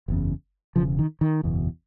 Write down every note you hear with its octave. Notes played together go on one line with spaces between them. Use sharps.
F#1 E2 C#3
E1 E2 C#3 F3
D#3
D#3
F#1 E2 B2